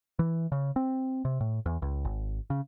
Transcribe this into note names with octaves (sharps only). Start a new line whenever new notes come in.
E3
C#3
C4
C3
A2
E2
C#2
G#1
C#3